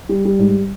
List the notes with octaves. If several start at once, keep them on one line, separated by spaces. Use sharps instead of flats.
G3
G3
G#2